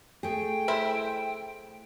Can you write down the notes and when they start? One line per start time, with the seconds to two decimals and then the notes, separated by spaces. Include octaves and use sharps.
0.23 A3 G#4 G5
0.68 E4 C5 E5